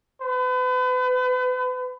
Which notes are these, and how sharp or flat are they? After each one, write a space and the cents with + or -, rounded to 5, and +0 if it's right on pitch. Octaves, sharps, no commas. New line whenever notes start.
B4 +35